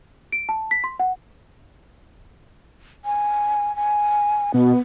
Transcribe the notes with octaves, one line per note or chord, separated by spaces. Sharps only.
D7
A5
B6
C6
F#5
G#5
G#5
B2 B3